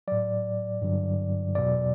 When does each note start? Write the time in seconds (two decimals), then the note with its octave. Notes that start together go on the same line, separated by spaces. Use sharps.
0.08 A2 F#3 D5
0.82 G2 D3 F#3
1.55 E2 B2 F#3 D5